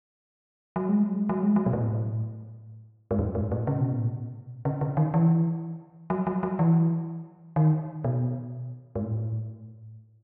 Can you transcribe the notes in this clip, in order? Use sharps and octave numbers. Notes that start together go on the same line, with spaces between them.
F#3
G#3
F#3
G#3
F#3
G#3
F#3
B2
A2
G#2
F#2
G#2
A2
C#3
B2
A2
B2
C#3
C#3
D#3
E3
F#3
F#3
F#3
E3
D#3
B2
G#2
A2